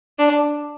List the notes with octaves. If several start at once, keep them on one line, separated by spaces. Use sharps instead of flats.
D4